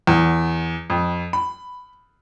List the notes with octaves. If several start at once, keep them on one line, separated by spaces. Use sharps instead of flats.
E2
F2
B5